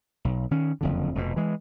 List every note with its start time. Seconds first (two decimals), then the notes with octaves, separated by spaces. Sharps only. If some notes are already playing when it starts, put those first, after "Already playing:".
0.25 B1
0.51 D#3 C#4
0.81 F#1 F2 D3
1.15 F1 F2 B2
1.36 E3 G#3